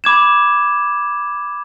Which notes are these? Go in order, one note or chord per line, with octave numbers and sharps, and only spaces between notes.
B5 D6 G#6 E7